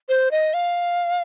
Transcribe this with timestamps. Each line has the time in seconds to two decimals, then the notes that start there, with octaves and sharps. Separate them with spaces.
0.09 C5
0.31 D#5
0.54 F5